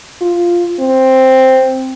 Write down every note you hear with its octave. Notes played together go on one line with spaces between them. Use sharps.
F4
C4